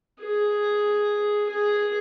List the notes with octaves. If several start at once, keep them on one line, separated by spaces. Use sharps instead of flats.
G#4
G#4